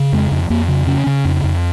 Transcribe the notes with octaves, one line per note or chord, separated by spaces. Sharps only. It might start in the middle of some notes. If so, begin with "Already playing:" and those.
Already playing: C#3
F2 G#3
F2
F2 A#3
C#3
C#3 C#4
C#3
F2
F2